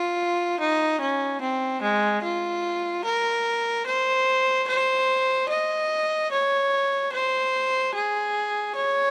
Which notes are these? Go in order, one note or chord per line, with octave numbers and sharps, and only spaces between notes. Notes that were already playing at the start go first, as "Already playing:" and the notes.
Already playing: F4
D#4
C#4
C4
G#3
F4
A#4
C5
C5
D#5
C#5
C5
G#4
C#5